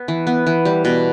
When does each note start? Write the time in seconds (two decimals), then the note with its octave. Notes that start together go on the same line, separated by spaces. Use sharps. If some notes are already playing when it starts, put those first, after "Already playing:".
Already playing: B3
0.08 E3
0.27 B3
0.47 E3
0.65 G3
0.85 B2